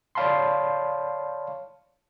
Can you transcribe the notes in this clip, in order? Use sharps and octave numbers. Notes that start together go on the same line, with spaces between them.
C#5 D5 F5 A5 B5 C6